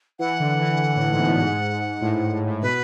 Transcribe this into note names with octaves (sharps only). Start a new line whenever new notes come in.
E3 F#5
D3
E3
A2
G#2
B2
A2
G#2
A2
A2
A2
B2 B4